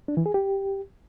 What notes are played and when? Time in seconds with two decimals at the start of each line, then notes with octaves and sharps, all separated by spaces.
0.08 D4
0.17 E3
0.26 G#4
0.34 G4